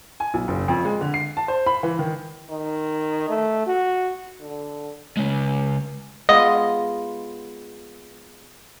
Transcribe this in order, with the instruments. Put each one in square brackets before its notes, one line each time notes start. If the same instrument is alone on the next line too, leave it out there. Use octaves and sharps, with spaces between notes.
[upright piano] G#5
B1
F#1
F2
G#3
D3
C7
A5
C5
B5
E3
D#3
[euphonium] D#3
A3
F#4
D3
[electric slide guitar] C#3 G#3
[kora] G#3 B3 F4 [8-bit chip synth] D#5